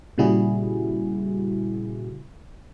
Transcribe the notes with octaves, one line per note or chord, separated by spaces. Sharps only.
A#2 C#3 G3 E4 F#4 G#4